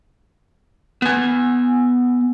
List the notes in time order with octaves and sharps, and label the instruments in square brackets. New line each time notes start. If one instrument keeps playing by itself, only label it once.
[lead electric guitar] B3 G#5